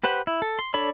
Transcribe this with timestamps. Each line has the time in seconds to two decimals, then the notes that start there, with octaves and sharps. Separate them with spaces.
0.03 G4 B4 C5 F#5
0.27 E4
0.42 A4
0.59 C6
0.74 D4 A4 C#5 D5 B5